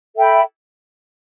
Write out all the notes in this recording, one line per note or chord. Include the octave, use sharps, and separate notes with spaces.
A4 E5 G5 B5